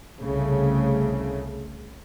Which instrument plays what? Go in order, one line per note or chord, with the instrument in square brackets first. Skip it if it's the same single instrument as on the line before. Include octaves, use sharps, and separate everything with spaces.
[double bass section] C2 C#3 A3